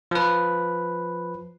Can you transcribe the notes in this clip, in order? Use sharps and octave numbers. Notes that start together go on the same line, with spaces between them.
F3 B4